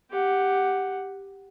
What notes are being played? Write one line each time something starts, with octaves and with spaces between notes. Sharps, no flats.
G4 F#5